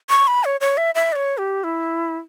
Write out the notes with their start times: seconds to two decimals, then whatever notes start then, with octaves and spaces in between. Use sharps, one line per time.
0.10 C#6
0.27 B5
0.44 C#5
0.61 C#5
0.77 E5
0.95 E5
1.12 D5
1.16 C#5
1.38 G4
1.64 E4